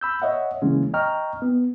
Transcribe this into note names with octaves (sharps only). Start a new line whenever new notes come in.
B5 E6 G6
C#5 D#5 E5 F#5
C#3 E3 G#3 A#3 C#4
D#5 G5 A#5 C#6 F6
B3